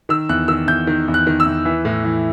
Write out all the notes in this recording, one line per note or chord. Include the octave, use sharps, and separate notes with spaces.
D#3 E6
E2 F#6
D#3 E6
E2 G6
D#3
E2
F#6
D#3
E6
E2
E3
A2
E3